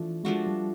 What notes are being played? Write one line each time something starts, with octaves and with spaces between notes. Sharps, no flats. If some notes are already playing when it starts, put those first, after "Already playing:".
Already playing: E3 F3 A3 D4
F3 G#3 A3 D4 F#4
G3